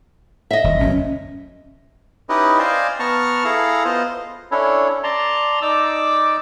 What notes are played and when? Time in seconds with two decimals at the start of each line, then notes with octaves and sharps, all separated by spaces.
0.51 D#5 E5
0.64 D#1
0.80 F#1 F#2 B2 C#4
2.29 C#4 D#4 E4 G4 B4 D#5
2.59 C5 D5 D#5 F5 G5 G#5
3.00 B3 A5 A#5 C#6 F6
3.44 E4 G#4 A4 F5 A#5
3.85 B3 F4 C5 D#5
4.51 C#4 D4 E4 A4 C#5
5.03 D5 A5 A#5 C6
5.62 D#4 D5 D6 E6